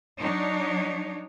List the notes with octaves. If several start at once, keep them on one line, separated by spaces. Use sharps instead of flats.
F#3 D4 D#4 C#5